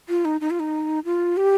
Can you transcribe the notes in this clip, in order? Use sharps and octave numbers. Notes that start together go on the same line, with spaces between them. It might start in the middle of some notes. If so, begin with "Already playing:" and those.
F4
D#4
D#4
F4
D#4
F4
G4